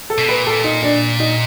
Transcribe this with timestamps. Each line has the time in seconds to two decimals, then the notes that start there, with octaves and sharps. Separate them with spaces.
0.10 A4
0.18 B2
0.28 A#2 B4
0.47 A4
0.64 D#4
0.83 D4
1.20 D#4